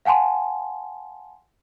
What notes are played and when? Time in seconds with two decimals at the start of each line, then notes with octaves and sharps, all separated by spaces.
0.05 F5 F#5 G#5 A5 C6